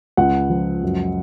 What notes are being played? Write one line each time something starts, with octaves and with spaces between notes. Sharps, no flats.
C#2 F#5
F3
F#2